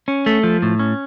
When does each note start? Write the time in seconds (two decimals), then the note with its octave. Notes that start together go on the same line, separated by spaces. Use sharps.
0.08 C#4
0.26 A3
0.43 F3
0.62 A2
0.79 C#4